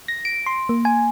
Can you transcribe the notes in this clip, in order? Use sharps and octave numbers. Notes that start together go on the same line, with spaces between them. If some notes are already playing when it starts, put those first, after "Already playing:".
A#6
D7
C6
A#3
G#5